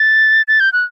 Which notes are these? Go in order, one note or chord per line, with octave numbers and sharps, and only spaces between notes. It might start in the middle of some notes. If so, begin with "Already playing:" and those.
Already playing: A6
A6
G6
F#6